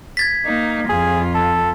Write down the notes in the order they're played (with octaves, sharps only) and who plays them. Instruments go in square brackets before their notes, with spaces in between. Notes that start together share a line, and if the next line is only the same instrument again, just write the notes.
[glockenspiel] G#6 A6 B6
[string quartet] A#3 D#4
[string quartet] F2 F4 [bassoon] G#4
[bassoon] A4